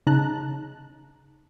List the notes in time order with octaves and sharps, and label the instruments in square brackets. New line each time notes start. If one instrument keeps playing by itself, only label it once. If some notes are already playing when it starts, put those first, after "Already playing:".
[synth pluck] C#3 D#4 A5 A#5 F#6